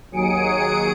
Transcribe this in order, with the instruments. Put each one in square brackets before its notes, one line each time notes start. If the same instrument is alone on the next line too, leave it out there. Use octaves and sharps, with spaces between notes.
[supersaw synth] D#2 F#3 G#4 D#6 C#7 D7